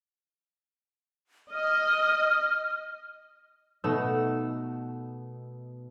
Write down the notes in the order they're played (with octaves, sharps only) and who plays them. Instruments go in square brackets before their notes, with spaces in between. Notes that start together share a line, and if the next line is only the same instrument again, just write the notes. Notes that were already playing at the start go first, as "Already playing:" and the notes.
[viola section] D#5 [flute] F6
[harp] B2 A3 B3 D#4 E6